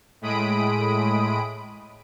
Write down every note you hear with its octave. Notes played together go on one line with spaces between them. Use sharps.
A2 G#3 B5 D#6 D7